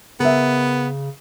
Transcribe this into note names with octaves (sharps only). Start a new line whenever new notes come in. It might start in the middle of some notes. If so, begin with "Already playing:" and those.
C#3 B3 A#4 E5